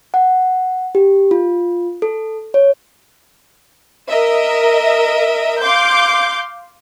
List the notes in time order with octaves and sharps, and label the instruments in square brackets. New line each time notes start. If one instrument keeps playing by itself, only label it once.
[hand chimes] F#5
G4
F4
A4
C#5
[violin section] A#4 D#5 E5
F5 C6 D6 G6